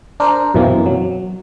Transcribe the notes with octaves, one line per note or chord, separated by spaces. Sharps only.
D4 A#4 C5
F#2 B2 E3 A#3 C4
F#3